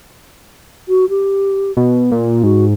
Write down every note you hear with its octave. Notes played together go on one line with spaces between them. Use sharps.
F#4
G4
B2
A#2 A#3
G#2 F#4